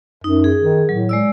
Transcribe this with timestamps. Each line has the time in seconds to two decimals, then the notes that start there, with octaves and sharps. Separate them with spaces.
0.24 F#2 D#4
0.44 G#4
0.61 D#3
0.89 A2 F#3
1.09 G#3 D5 E6